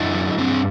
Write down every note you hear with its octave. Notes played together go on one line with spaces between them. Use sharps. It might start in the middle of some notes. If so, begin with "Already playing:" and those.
Already playing: F#2 D4 E4
F#3
G2 C4 D4